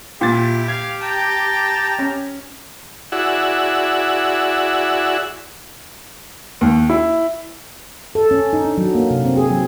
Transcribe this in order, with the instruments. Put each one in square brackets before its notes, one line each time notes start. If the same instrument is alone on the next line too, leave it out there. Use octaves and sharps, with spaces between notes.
[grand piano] A#2 A6 [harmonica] E4 [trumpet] G4
[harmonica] F5 [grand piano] G#6
[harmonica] G5 A5 A#5
[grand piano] C#4
[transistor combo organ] E4 F#4 G#4 D5 F#5 E6
[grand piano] D#2
E4
[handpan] A4
C#4
D#4
D4
F#3
A#3
C3
C4
G#4
F#3